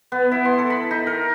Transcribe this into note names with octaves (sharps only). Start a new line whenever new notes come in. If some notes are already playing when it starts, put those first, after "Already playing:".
B3
E4
C6
A4
B5
D#4
A#4